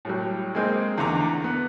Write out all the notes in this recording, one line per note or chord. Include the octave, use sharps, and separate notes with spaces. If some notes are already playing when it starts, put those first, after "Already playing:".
A2 F#3 G3
G#3 A#3 C4 D#4
E2 D3 A3 A#5 D6
B3